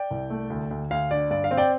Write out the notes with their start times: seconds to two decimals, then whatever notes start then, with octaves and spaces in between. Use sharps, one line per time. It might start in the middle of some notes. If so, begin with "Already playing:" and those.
Already playing: D5 G5
0.11 C2
0.30 A3
0.50 D2
0.71 D2
0.91 D2 F5
1.11 D3 D5
1.31 G2 D5
1.44 F5
1.51 C4
1.57 D5 G5